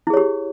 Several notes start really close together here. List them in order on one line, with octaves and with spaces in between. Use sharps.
E4 G#4 C#5 G4